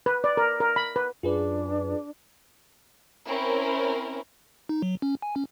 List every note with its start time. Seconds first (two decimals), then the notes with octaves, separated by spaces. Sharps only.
0.06 B4
0.24 D5
0.37 A#4
0.60 A#4
0.76 B5
0.96 B4
1.23 F#2 D4 F4 G#4 B4
3.27 C4 C#4 E4 A#4
4.69 D#4
4.82 F#3
5.02 C#4
5.22 G#5
5.36 C#4